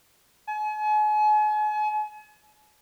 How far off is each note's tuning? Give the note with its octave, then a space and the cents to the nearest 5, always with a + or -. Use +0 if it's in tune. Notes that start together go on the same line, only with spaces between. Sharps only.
G#5 +40